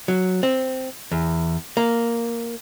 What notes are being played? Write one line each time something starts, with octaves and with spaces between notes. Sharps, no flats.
F#3
C4
E2
A#3